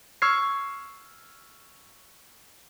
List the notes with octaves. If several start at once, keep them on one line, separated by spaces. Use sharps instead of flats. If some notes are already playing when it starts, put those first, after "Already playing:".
C#6 E6 F6 G#6 C7